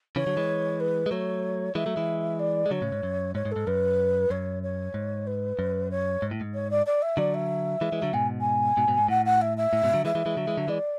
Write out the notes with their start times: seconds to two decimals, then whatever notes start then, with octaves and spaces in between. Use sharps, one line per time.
0.16 C#3 E3 C#5
0.27 D3 F#3
0.37 E3 G#3
0.80 B4
1.06 G#3
1.11 F#3 A3 C#5
1.75 E3 G#3 E5
1.86 F#3 A3
1.96 E3 G#3
2.39 D5
2.66 G#3
2.71 D3 F#3 C#5
2.82 A2 C#3
2.92 G#2
3.03 F#2
3.35 G#2 C#5
3.45 G#2
3.51 A4
3.56 G#2
3.67 F#2 B4
4.30 F#2 C#5
4.63 C#5
4.94 G#2
5.26 B4
5.59 F#2
5.90 C#5
6.22 G#2
6.31 A2
6.41 G#2
6.54 C#5
6.70 D5
6.86 D5
7.02 E5
7.17 D3 F#3 D5
7.34 E5
7.81 E3 G#3
7.92 E3 G#3
8.02 D3 F#3
8.13 G#2 B2 G#5
8.40 G#5
8.77 G#2 B2
8.88 G#2 B2
8.98 G#2
9.08 A2 F#5
9.25 F#5
9.41 E5
9.57 E5
9.73 A2
9.83 G#2 B2
9.94 D3 F#3
10.05 E3 G#3 E5
10.15 E3 G#3
10.26 E3 G#3
10.37 D3 F#3
10.47 E3 G#3
10.57 D3 F#3
10.68 E3 G#3 D5